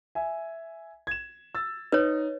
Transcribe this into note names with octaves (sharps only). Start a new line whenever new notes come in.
E5 G#5
G#6 E7
E6 A6
D#4 B4 C#5